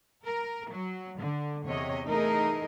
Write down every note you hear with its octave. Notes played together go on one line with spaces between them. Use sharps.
A#4
F#3
D3
E2 C3 C#5 D#5
E3 A3 D#4 G#4 A#4 D#5